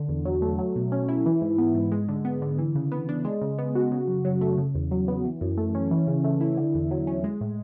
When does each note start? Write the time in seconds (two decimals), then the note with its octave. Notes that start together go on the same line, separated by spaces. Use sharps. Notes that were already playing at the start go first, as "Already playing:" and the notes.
Already playing: D3
0.09 E2
0.25 F#3
0.42 A3
0.58 F#3
0.76 B2
0.92 C#4
1.08 E4
1.26 E3
1.41 G#2
1.58 B3
1.75 G#2
1.92 G#3
2.09 D3
2.25 B3
2.42 D3
2.58 E3
2.75 C#3
2.92 B3
3.09 D4
3.25 G#3
3.42 C#3
3.58 B3
3.75 F#4
3.92 C#3
4.08 F#2
4.25 F#3
4.41 A3
4.58 C#3
4.75 E2
4.91 F#3
5.08 B3
5.25 E3
5.41 F#2
5.58 A3
5.75 C#4
5.91 E3
6.07 C#3
6.24 A3
6.41 E4
6.57 D3
6.75 E2
6.91 F#3
7.07 C#4
7.24 G#3
7.41 A2